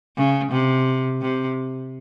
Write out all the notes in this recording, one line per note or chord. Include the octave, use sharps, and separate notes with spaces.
C#3
C3
C3